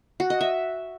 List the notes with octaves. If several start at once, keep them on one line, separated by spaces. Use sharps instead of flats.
F#4
D#5
E5